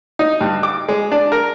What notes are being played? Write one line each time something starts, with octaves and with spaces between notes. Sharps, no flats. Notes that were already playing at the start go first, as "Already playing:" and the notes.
D#4
G2
D6
G#3
D4
A#4